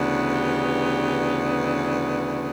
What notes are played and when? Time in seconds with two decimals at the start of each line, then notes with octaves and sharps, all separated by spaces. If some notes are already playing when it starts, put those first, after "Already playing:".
Already playing: D2 C#3 E3 B3 D4
0.31 G4